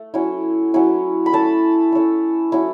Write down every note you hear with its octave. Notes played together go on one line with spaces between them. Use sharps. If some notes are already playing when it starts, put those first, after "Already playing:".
Already playing: A3
F#3 C#4 E4
F#3 C#4 E4
B5
A3 C#4 E4 A5
A3 C#4 E4
F#3 C#4 E4